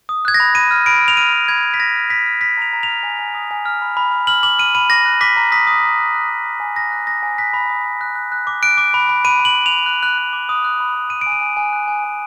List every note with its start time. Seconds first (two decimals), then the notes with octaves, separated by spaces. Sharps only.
0.09 D#6
0.25 F#6 G#6
0.34 A#6
0.40 B5
0.55 B5 D#7
0.71 F6
0.86 B5 D7
1.01 F6
1.08 F7
1.17 F6 D#7
1.33 B5
1.48 B5 G#6
1.64 B5
1.74 B6
1.79 B5 A#6
1.96 F6
2.10 F6 B6
2.26 F6
2.41 F6 B6
2.57 A#5 F7
2.73 A#5
2.83 F7
2.88 F6
3.03 G#5
3.19 G#5
3.35 D#6
3.51 G#5
3.66 F6
3.82 B5
3.97 B5
4.12 F6
4.27 F6 F#7
4.43 D6 F#7
4.59 F6 D#7
4.75 B5 D#7
4.90 D6 A#6
5.05 F#6
5.21 D6 B6
5.37 A#5
5.52 D#6 B6
5.67 D#6
5.83 A#5
5.99 F#6
6.14 F#6
6.30 D#6
6.45 D#6
6.60 G#5
6.76 D#6 A#6
6.92 F#6
7.07 D#6 A#6
7.23 G#5
7.38 F#6 B6
7.54 B5
7.69 D#6
7.85 B5
8.01 F#6
8.16 F#6
8.32 F#6
8.47 D6
8.62 F#6 D7
8.78 D6
8.94 B5
9.09 B5
9.25 B5 D#7
9.39 B5
9.45 F#7
9.55 B5
9.66 F7
9.71 B5
9.86 F#6
10.03 F#6
10.18 F#6
10.33 D6
10.49 D#6
10.64 F#6
10.80 B5
10.95 B5
11.10 F#6 D#7
11.21 G#5 D7
11.32 D#7
11.41 G#5
11.57 G#5
11.73 F#6
11.88 G#5
12.04 G#5